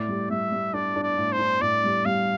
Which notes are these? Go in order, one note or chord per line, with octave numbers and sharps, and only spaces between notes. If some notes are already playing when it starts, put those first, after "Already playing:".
Already playing: A2 D5
G3
G3 E5
G3
D4 D5
D4
D5
A2
C5
D4
A2 D5
G3
G3 F5